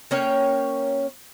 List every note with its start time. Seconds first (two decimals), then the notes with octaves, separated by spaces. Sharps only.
0.11 A#3 C#4 C#5 G5